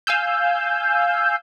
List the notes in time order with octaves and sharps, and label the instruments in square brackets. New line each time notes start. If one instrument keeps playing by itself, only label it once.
[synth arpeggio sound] F5 G#5 E6 G6